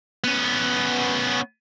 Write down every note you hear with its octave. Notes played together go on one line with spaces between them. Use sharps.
B3 C#4